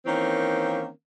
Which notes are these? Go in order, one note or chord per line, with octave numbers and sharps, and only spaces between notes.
D#3 E3 A#3 C4 C#4